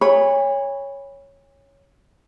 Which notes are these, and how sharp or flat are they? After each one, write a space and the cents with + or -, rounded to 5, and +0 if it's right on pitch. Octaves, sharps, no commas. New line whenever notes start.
C#5 +0 G#5 -40 B5 +0